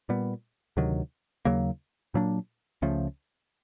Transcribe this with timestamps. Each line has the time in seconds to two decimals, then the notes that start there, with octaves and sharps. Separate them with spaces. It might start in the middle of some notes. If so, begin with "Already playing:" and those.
0.09 A#2 G3 B3
0.77 D2 C3 D#3 F#3
1.45 D#2 C#3 F#3 A#3
2.14 A#2 F#3 A#3 D4
2.82 C#2 C#3 F3 A3